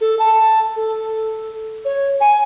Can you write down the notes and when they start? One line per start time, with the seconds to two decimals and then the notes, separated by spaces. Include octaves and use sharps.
0.01 A4
0.19 A5
0.76 A4
1.85 C#5
2.20 G#5